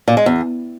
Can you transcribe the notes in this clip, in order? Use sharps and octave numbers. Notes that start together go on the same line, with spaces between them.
A#2
G#3
E2